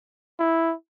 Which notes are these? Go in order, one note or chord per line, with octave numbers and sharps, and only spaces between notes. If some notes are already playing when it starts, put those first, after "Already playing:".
E4